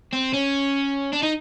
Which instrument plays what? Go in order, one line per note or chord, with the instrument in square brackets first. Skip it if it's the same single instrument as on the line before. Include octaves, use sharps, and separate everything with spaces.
[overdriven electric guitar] C4
C#4
D4
D#4